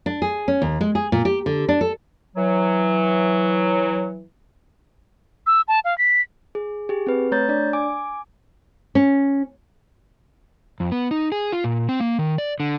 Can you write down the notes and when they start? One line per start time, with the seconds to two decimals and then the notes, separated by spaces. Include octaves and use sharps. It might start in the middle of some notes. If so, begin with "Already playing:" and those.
0.06 D4
0.22 G#4
0.48 C#4
0.62 D#2
0.81 G#3
0.95 G#4
1.12 A#2
1.25 G4
1.46 D3
1.69 D4
1.81 A4
2.36 E3 F#3
5.46 E6
5.68 A5
5.84 F5
5.98 B6
6.55 G#4
6.89 G4 G#4
7.07 C4 B4
7.32 A3 C#5 A#5 G6 A6
7.49 D4 D5
7.73 G#5 D6
8.95 C#4
10.80 F2
10.92 B3
11.11 D#4
11.32 G#4
11.52 F4
11.64 A#2
11.89 C4
12.00 A#3
12.19 D#3
12.38 D5
12.60 D3